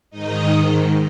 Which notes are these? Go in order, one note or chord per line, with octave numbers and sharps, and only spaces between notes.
G#2 D#3 D#4 D#5